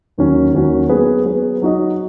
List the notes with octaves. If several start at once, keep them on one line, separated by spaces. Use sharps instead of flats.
D#2 D#3 F#3 C#4 F#4
D#2 D#3 F#3 C#4 F#4
F#3 B3 G#4 B4
F#3 B3 G#4 B4
F#3 D#4 F#4 D#5